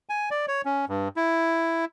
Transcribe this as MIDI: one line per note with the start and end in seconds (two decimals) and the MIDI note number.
0.09 0.29 80
0.31 0.46 74
0.48 0.62 73
0.65 0.85 61
0.89 1.08 43
1.16 1.85 64